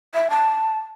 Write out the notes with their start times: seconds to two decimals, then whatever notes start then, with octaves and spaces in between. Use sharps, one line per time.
0.14 E5
0.30 A5